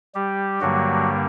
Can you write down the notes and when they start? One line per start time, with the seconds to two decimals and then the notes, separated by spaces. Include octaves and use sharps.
0.15 G3 G4
0.61 G2 D3 F#3 G3 A#3 F#4